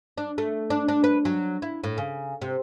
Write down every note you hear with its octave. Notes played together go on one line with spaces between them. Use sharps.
D4
A3
D4
D4
B4
F#3
E4
A2
C#3
C3